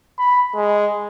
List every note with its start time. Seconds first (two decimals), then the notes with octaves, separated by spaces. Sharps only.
0.19 B5
0.54 G#3